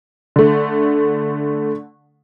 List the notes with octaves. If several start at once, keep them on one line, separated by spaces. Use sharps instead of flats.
D3 A3